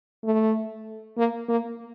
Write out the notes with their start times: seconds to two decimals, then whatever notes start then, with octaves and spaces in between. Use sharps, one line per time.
0.24 A3
1.17 A#3
1.48 A#3